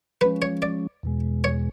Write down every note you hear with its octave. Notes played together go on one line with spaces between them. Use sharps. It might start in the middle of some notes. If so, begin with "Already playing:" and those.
F3 G#3 C#4 B4
C#5
D5
E2 B2 G#3
C#5